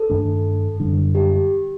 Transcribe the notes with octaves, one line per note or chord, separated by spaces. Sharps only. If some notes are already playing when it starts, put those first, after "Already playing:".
Already playing: A4
G2 D#3 A3 D4
F#2 D3 G3 D4
G4